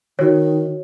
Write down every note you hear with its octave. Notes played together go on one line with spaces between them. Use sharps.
D#3 F#4 C#5